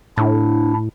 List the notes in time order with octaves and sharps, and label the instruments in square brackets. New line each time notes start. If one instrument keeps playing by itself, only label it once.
[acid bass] A2 [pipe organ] D4 E4